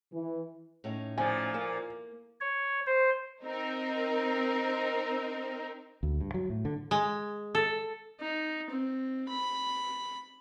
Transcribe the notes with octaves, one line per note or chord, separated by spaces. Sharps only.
E3
A2 C#4 D#4
A#2 F3 G#5
A#3
C#5
C5
C4 D#4 A#4
D2
G2
F#3
A2
D3
G#3
A4
D#4
C4
B5